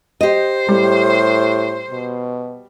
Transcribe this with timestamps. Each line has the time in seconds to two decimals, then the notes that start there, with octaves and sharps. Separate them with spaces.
0.21 G4 C5 D#5
0.68 A2 G3
1.91 B2